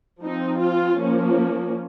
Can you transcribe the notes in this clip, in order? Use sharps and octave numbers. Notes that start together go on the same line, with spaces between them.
F3 C4 D#4
F4
F3 A#3 C#4